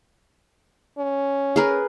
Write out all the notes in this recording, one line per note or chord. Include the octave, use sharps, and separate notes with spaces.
C#4
G#4 A#4 B4